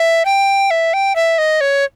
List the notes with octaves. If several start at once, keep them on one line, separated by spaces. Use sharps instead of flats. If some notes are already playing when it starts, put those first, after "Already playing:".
Already playing: E5
G5
E5
G5
E5
D#5
C#5